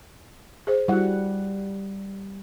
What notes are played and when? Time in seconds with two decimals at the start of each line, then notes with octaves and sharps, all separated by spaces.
0.67 G#4 C5
0.88 G3 E4 F#4 F#5